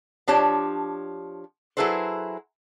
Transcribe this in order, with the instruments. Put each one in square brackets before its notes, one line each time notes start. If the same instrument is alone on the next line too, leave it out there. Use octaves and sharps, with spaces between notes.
[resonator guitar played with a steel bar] F3 D4 G4 C#5 A5
F#3 E4 G#4 A4 B4 C5